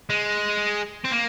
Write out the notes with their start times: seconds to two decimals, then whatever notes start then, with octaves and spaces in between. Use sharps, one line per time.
0.10 G#3
1.05 C4
1.12 A#3